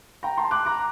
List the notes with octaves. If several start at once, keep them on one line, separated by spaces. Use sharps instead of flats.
G5 A#5
A5 C6
D6 F#6
A#5 D6